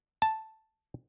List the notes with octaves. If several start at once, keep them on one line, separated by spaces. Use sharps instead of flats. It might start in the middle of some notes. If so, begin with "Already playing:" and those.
A5